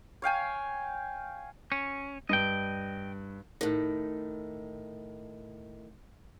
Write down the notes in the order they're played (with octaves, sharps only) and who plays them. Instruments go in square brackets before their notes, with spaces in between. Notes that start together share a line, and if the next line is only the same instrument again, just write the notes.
[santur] C#5 F5 G5 G#5
[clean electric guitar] C#4
[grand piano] G2 [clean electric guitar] D#5 G5
[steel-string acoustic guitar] A2 D#3